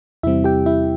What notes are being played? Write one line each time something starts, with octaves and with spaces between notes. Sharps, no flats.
E2 C3 G3 C4 E4 E5
G4 G5
E4 E5